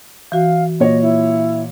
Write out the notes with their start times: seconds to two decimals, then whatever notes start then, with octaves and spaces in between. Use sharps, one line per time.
0.32 E3 F#4 F5
0.80 A#2 C#5 D#5
1.02 E4